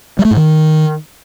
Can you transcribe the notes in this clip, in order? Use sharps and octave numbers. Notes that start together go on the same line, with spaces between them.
G3
A3
G#2
D#3